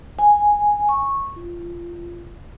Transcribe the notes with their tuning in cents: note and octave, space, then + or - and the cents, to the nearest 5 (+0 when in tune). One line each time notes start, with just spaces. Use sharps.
G#5 -5
C#6 -10
F4 -20